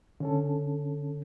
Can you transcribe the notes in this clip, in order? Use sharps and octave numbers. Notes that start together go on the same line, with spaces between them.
D3 C#4 A4